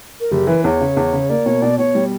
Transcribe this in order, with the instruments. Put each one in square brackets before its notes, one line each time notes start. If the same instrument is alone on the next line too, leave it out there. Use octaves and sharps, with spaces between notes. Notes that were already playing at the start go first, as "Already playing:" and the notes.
[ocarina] A#4
[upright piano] F#1 [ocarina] G4
[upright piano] E3 [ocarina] B4
[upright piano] E2 [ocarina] C#5
[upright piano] C#3
E2
C#3
[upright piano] A#3 [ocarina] D5
[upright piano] B2 [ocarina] C#5
[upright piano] B2 [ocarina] D5
[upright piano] B2 [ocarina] C#5
[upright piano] G3